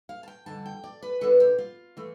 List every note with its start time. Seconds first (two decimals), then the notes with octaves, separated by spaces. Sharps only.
0.09 F5
0.23 A5
0.28 G5
0.46 F2 D3 G3 A5
0.66 G5
0.84 D5
1.02 B4
1.21 B2 B3 D4 A4
1.40 G4
1.58 F4
1.97 E3 A3